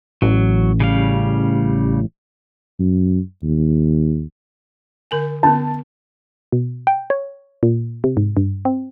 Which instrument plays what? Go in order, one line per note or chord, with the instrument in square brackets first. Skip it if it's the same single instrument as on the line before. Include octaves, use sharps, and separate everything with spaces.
[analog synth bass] A1 [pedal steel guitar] F#3
[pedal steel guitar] C#3 G3 F5
[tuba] F#2
D#2
[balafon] D3 A#4 G#5
[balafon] D3 B3 [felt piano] A5
[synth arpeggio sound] B2
G5
C#5
A#2
C3
G#2
G2
C4